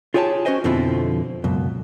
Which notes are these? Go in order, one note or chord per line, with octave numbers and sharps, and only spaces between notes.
F4 G4 G#4 C#5 G5 A5
C#4 F#4 G4 C5 D#5 G#5
F2 B2 D3 F3 C4 E4
C#2 F#2 B2